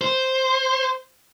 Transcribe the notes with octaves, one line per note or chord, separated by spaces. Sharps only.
C5